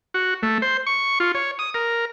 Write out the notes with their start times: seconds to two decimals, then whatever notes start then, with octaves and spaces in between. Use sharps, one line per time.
0.14 F#4
0.43 A3
0.62 C5
0.87 C#6
1.20 F4
1.35 C#5
1.59 D#6
1.74 A#4